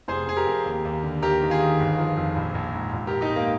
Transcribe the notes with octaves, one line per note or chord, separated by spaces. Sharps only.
F1 G#4 C5
F1 G#4
G4 A#4
F2
D#2
D#2
D3
D#2 G4 A#4
D#3
F4 G#4
D#3
G1
F3
F2
A#1
A#1
G#2
A#1
A#1 G4 A#4
D#4 G4
G#2 A#3